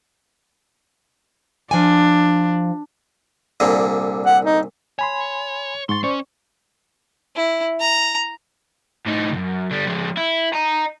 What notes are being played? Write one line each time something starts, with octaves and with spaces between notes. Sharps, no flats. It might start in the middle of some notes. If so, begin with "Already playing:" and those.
F3 D4 G#5
C2 A#2 D3
F#5
D#4
C#5 G#5 B5 C6
G#2 C6 C#6 A6
C#4 C5 D5 C#6
E4
A#5
A2 D#4
C#2 F#2
D3 G3
F3 G#3
E4
D#5 A#5